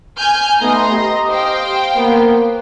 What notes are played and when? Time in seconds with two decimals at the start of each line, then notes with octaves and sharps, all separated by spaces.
0.17 G#5 F6 G6
0.61 A3 B3 D#4 A#5 C6
0.91 G4 D#5
1.28 C5 F5 G5
1.96 A#3 B3